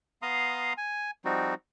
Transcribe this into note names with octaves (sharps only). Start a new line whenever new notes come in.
B3 F5 A#5 C6 D#6
G#5
F3 G3 C4 D#4 F#4